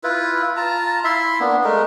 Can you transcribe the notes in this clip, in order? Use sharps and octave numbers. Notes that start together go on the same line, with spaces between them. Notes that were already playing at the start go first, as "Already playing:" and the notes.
E4 F4 B4
F4 A5 A#5
E4 E5 C6
A#3 B3 D4
G#3 A3 A#4